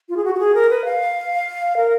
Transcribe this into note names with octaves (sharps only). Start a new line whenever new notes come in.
F4
G#4
F#4
F#4
G#4
A#4
B4
F5
A#4